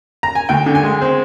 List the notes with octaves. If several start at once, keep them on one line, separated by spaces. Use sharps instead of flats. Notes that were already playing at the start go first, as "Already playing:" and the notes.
A#5
G#5
D2 G5
D3
G#5
G#3
C4